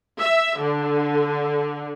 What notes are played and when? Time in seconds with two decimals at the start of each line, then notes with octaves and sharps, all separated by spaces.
0.20 E5
0.61 D3